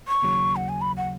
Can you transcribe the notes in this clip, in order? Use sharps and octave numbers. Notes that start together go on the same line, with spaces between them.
C#6
D#2 C#3 F#3
F#5
G#5
B5
F#5